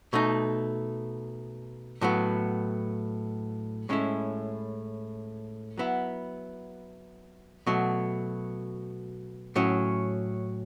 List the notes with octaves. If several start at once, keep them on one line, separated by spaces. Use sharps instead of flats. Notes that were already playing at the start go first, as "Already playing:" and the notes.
B2 A3 D#4
A2 F#3 B3
A2 G#3 C#4 E4
F#3 B3 E4
B2 F#3 A3
A2 F#3 C#4